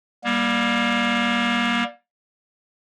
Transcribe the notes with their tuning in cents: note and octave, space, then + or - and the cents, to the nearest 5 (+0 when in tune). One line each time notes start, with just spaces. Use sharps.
G3 +0 A#3 +30